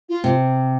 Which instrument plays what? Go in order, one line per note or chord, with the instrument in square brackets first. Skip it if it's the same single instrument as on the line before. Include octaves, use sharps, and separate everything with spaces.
[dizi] F4
[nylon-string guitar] C3